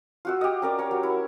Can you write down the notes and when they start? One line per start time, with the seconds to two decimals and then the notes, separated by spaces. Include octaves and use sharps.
0.25 F4 F#4 E6
0.41 G4 D#5
0.62 C#4 A#4 D5
0.78 A#4 C#5
0.91 F#3
1.03 E4